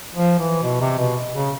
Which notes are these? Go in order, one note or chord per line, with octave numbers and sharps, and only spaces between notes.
F3
E3
B2
C3
B2
C#3